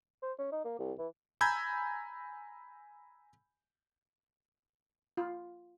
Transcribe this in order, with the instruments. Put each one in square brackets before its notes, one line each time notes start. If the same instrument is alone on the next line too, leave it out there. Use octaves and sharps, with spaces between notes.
[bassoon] C5
C#4
D#4
A#3
C2
E3
[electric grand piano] G#5 A#5 B5 E6 G6 G#6
[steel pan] F4